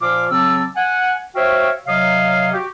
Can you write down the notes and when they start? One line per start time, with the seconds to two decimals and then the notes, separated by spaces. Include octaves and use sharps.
0.01 A#2 F3 F4 F5 D6
0.30 C#3 F#3 C4 A5 D6 E6
0.76 F#5 G#5
1.36 F#4 C5 C#5 E5 F5 G5
1.87 C3 F#3 C#5 D#5 F5
2.54 F#4 G4